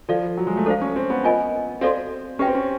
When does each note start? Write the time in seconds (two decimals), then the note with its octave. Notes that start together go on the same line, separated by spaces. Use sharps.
0.09 F3 A4 D5 F5
0.37 F#3
0.47 G#3
0.57 A3
0.66 D4 A4 C5 F5
0.81 C#4
0.96 C4
1.10 B3
1.24 D4 F4 A#4 D#5 G#5
1.81 C4 F#4 A4 D5 F5
2.39 C#4 G4 B4 E5 G5
2.47 C4
2.55 C#4